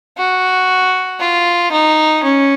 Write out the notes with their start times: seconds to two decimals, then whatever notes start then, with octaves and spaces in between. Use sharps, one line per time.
0.18 F#4
1.20 F4
1.72 D#4
2.23 C#4